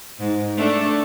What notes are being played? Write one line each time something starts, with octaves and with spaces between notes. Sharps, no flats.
G#2
A3 D4 A4